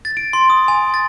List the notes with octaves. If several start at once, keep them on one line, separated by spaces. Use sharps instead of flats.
A6
D7
C6
D#6
G#5
A6